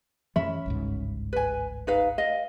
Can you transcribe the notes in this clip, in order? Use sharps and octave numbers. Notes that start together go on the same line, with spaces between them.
F#2 E3 F3 C#4 E5 B5
G1 C#2 G#2
B4 G#5
D#4 B4 F5
D#5 F5